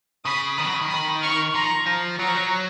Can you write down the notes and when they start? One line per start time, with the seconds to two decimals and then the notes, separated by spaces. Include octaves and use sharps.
0.25 C#3 B5 D#6
0.57 D#3 B5 D#6
0.65 F#3
0.74 C#3
0.81 D#3
0.89 B5 D#6
1.22 C#6 F6
1.54 F3 A#5 C#6
1.86 F3
2.18 F#3 A#5 C#6
2.28 F3
2.35 F#3